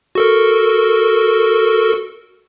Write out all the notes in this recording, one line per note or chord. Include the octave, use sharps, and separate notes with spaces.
F#4 A4 A#4